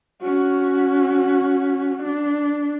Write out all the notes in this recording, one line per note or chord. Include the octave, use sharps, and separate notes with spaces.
C#4 F#4
D4